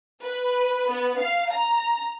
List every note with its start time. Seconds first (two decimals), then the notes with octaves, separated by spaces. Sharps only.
0.22 B4
0.90 B3
1.20 F5
1.50 A#5